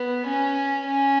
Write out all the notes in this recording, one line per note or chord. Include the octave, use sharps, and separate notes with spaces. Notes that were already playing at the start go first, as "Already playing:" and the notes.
Already playing: B3
C#4
C#4